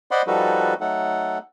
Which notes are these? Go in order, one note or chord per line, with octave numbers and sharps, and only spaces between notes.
C5 D5 D#5 F#5 B5 C6
F3 G3 D#4 F#4 A4 B4
F#3 A3 D#4 A4 F#5